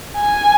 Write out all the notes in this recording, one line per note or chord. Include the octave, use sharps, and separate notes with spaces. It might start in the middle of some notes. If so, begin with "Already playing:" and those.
G#5